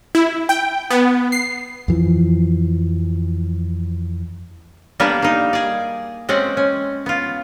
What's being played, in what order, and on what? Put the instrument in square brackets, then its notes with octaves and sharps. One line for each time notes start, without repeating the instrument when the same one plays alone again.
[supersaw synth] E4
G5
B3
C7
[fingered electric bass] F2 E3 F3
[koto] G3 A#3 B3 D4 A#4 B4
A#3 D#4
G#4 D5
G#3 C4 C#4 D5 F#5
C#4
B3 F4